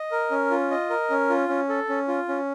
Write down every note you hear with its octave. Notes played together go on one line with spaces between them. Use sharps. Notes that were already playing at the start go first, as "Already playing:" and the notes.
Already playing: D#5
A#4
C#4
F4
D#5
A#4
C#4
F4
C#4
A4
C#4
F4
C#4